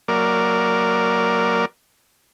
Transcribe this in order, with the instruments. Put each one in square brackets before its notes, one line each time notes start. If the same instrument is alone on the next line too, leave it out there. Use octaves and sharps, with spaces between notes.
[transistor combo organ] F#3 A#3 A#4 D5